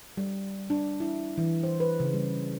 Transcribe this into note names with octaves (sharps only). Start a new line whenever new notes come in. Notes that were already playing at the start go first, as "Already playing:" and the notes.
G3
D4
E4
E3
C5
B4
C#3
G3